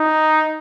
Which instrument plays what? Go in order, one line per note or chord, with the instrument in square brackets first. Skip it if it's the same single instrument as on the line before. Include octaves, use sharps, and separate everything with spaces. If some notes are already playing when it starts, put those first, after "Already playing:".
Already playing: [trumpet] D#4